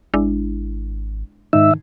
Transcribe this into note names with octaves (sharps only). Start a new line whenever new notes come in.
G#1 G#3 D4 E4
G#2 D#3 D#4 E5